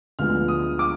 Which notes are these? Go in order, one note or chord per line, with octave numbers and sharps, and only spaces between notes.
D2 D3 F3 G#3 B3 F6
D#6
D6